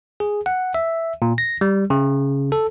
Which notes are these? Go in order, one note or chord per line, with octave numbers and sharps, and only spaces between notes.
G#4
F#5
E5
A#2
A#6
G3
C#3
A4